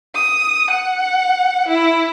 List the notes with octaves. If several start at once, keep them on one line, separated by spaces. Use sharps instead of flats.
D#6
F#5
E4